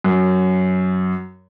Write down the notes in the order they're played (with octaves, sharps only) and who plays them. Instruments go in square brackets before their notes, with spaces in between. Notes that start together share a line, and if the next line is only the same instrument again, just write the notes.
[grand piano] F#2